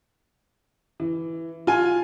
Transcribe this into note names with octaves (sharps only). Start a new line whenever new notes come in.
E3
F4 G#5